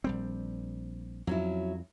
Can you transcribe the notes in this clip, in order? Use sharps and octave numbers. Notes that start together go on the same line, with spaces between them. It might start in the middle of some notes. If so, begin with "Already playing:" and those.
A#1 G3 C4
F2 F#3 C#4 E4